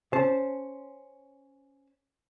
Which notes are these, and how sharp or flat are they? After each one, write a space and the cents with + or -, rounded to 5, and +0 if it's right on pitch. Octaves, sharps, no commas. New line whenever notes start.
C#4 +0 C5 +0 A5 -10